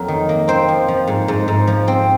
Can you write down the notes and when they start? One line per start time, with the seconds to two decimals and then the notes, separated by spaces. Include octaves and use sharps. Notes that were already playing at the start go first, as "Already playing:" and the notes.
Already playing: F2 F#3 A#3 A#4
0.08 D#3
0.29 A#3
0.48 C4 C5
0.68 F3
0.88 F3
1.08 G#2
1.28 G#2
1.48 G#2
1.67 F3
1.88 C4